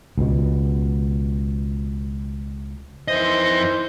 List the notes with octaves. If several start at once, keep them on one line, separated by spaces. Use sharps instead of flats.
C#2 B2
F2 D#3 E3 C5 D#5